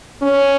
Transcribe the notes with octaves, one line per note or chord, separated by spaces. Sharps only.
C#4